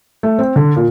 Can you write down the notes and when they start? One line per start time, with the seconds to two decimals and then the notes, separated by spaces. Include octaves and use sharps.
0.23 A3
0.39 C4
0.56 D3
0.76 A#2